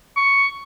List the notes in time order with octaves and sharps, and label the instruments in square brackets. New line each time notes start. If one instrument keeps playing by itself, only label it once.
[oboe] C#6